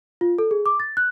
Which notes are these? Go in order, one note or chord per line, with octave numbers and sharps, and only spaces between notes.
F4
A4
G#4
D6
A6
F#6